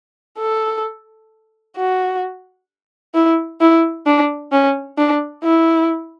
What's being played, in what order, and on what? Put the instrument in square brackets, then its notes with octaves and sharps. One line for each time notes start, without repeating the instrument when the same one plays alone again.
[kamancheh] A4
F#4
E4
E4
D4
C#4
D4
E4